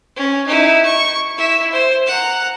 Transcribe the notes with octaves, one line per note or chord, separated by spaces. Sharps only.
C#4
D#4 E4
C#6
E4 E5
C5
F#5 A#5